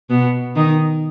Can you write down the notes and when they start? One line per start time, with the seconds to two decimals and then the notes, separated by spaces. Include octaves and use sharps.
0.10 B2 B3
0.56 D#3 D#4